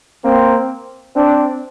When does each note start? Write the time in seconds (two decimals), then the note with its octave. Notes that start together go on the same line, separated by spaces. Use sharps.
0.24 A#3 C4
1.14 C4 D4